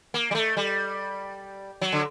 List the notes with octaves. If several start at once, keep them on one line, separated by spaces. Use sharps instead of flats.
A#3
G3
A3
G3
F#3
D3